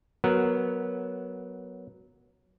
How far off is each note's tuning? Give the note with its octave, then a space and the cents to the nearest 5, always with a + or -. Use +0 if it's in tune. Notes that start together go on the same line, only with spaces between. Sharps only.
F#3 +0 B3 -15 A#4 +0